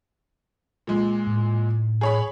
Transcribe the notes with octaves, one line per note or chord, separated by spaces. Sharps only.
A#2 G#3
A2
G#4 C#5 B5